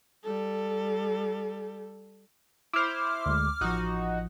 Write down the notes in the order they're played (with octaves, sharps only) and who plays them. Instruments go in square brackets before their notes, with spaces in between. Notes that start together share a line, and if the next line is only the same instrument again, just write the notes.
[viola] G3 A4
[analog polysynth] E4 C5 [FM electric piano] D6 F6
[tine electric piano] D2 G#3
[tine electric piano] A1 F3 [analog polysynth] D#4 F#4